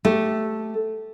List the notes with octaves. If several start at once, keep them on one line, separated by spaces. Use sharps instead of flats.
A3 G4